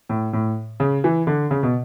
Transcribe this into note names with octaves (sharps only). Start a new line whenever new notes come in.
A2
A2
C#3
E3
D3
C#3
B2